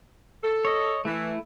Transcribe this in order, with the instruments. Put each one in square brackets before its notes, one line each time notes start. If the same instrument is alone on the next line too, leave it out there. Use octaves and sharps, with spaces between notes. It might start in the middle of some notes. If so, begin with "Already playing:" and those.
[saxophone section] A4
[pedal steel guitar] C#5 D#5
[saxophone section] E3 [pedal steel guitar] A3 E4